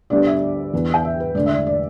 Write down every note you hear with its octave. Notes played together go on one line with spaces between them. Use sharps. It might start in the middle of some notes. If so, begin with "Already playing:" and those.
D2 D3 G3 B3 D5
E5
E2 E3 B3
G5
E5
B4
E1 D2 D3 A3 D5
E5
D5
D5